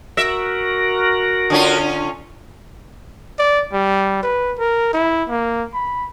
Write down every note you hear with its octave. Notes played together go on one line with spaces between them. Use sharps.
F#4 A#4 E5
D3 C#4 F4
D5
G3
B4
A#4
E4
A#3
B5